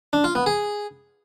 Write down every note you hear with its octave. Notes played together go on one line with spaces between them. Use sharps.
D4
F4
B3
G#4